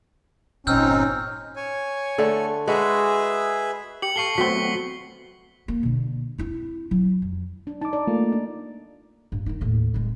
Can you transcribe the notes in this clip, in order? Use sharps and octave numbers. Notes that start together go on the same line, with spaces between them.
G1 A#2 C4 C#4 D#4 E6 F6 G6
C#5 G#5
D3 A3 A4
G#3 F#4 G#4 B4 E5
G4 C#7 F#7
A4 F5 A5 C#6 C7 G7
F#3 A3 B3 C4 F#4 B6 G7
A#3
B2 D3
C4 E4
F#3 E4
F2
D4
D#4 A5 D6
D5
A3 A#3 F4
D4
G2
D#3 D#4
D#2 A2
D1 G#3